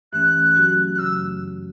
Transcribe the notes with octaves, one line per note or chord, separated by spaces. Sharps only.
G2 E3 A3 C#4 F#6
F#3 A3 C#4 F#4
F#6
F#2 C#3 F#3 A3 E6